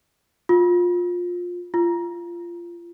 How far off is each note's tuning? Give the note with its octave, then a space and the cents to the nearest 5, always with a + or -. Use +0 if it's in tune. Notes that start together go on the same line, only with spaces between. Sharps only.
F4 +20
F4 -20